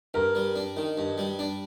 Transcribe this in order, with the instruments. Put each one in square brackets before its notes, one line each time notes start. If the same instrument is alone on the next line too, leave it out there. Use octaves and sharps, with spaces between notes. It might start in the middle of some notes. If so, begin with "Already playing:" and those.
[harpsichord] G2 [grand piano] A#4
[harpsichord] G3
D4
D#3
G2
G3
D4